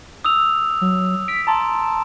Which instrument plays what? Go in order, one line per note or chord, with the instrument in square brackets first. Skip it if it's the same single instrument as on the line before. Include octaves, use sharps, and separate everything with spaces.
[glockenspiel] D#6 E6 F7
[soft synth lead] F#3
[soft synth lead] B6 [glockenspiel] D7
[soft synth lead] A5 [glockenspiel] A#5 C6